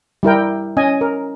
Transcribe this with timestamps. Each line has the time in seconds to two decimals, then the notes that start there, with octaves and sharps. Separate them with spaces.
0.23 G3 E4 A#4 G5
0.77 C#4 D#5 G#5
1.01 A#4